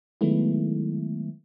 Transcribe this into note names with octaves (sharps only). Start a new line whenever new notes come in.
D#3 F#3 G#3 A3 B3 E4